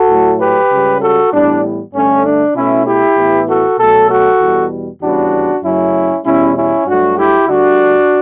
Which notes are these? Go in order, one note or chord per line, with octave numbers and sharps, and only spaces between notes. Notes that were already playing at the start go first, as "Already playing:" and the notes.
Already playing: F#4 A4
A2 F#3 A3
G4 B4
C#2 C#3 G3
F#4 A4
A2 E3 G3 B3 D4
G2 D3 A3 C#4
D4
B2 A3 C#4 E4
E4 G4
A2 E3 B3
F#4 A4
B2 F#3 A3 F#4 A4
F#4 A4
E2 B2 G3
E2 C#3 G3 B3 D4 F#4
F#2 C#3 F#3 A3 C#4 E4
E2 B2 G3 C#4 E4
C#4 E4
G2 F#3 A3 D4 F#4
E4 G4
D2 D3 G3 D4 F#4